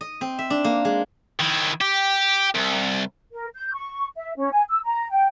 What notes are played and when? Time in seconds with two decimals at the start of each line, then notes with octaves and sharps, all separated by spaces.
0.01 D#5
0.21 C4
0.39 E5
0.50 D4
0.64 A#3
0.85 G#3
1.40 D#3 E4
1.81 G4
2.55 C2
3.33 A#4
3.55 G6
3.74 C#6
4.17 E5
4.38 C#4
4.52 G#5
4.70 E6
4.85 A#5
5.10 G5